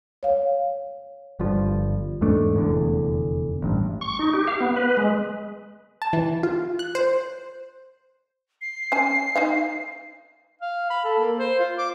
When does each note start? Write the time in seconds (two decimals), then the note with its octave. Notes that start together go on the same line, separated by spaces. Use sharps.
0.23 C#5 F5
1.40 G1 G2 F3
2.21 E2 G#2 A3 D4
2.54 F1 E2 D3
3.62 A1 G2
4.01 C#6
4.19 D#4
4.33 G4
4.47 F5
4.60 B3
4.76 B4
4.97 G#3
6.02 A5
6.13 E3
6.43 F4
6.79 F#6
6.95 C5
8.61 C7
8.92 C#4 G#5
9.36 D#4 D#5 F5
10.61 F5
10.90 B5
11.04 A4
11.19 A#3
11.39 C5
11.59 F4
11.78 D6